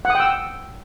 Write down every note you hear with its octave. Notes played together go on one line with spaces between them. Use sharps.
F#5
D#6
G5
E6